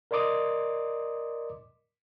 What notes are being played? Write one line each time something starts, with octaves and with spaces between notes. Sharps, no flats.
A#4 D5 D#5 C6 D6 D#6